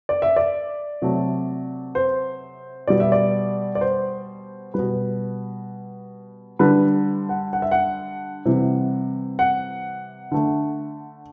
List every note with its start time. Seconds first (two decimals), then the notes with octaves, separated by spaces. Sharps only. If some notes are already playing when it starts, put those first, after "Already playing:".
0.09 D5
0.22 E5
0.36 D5
1.02 C3 F#3 A3
1.95 C5
2.87 B2 G3 D5
3.00 E5
3.12 D5
3.75 D5
3.81 C5
4.74 B2 G3 B4
6.59 D3 G3 B4
7.29 F#5
7.53 F#5
7.62 E5
7.71 F#5
8.46 C3 E3 G3
9.39 F#5
10.32 D3 A3